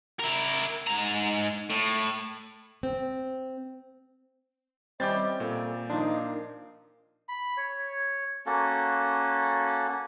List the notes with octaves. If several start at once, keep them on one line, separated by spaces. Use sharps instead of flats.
E4 A#4
G#2 A#5
A2
C4
G3 C4 C#4 E4 D#5 D6 G6 A6
A#2 A4
F3 A#3 D4 D#4 C5
B5
C#5
A#3 C#4 F#4 A4